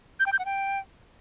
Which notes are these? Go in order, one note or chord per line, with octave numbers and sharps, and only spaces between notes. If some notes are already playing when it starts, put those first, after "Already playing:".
G6
G5
G6
F#5
G5